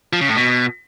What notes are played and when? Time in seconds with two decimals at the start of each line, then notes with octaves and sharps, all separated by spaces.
0.13 F3
0.21 C#3
0.29 A2
0.37 B2